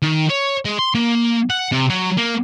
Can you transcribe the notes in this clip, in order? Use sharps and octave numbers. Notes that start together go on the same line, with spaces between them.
D#3
C#5
G#3
C6
A#3
F#5
C3
F#3
A#3